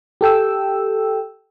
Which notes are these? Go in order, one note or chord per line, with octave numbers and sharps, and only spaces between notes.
G4 A4 G5 E6